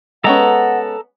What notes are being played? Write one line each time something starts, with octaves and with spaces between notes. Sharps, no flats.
G#3 B3 C#4 A4 F#5 A#5